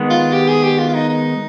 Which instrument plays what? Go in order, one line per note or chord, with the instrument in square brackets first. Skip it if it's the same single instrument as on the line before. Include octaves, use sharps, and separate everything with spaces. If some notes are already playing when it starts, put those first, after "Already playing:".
Already playing: [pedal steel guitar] D#3 G#3 B3
[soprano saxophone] F4
G4
G#4
G4
F4
F4
D#4
D#4